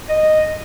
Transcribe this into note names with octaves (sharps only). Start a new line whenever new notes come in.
D#5